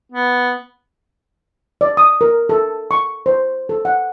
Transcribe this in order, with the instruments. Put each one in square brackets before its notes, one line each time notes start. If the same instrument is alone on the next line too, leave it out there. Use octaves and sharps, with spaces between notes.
[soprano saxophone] B3
[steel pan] D5
D#6
A#4
A4
C#6
C5
A4
F#5